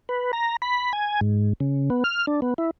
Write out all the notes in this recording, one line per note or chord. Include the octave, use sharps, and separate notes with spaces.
B4
A#5
B5
G#5
G#2
C#3
B3
F6
D4
B3
E4